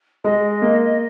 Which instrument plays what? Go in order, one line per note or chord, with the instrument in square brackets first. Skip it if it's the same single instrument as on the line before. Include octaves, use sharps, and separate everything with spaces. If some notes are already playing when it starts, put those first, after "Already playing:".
[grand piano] G#3 [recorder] D#5
[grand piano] A#3